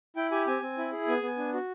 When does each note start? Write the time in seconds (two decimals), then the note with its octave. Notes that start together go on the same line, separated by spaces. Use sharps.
0.16 E4 G5
0.31 G4 G#5
0.47 C4 G#5
0.62 C4
0.78 E4
0.92 G#4
1.08 B3 G#5
1.22 B3
1.37 D4
1.53 F#4